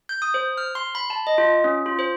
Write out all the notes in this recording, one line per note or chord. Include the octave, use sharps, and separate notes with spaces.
G6
D#6
C5
F6
C6
B5
A5
D#5
F4
C#4
F4
C5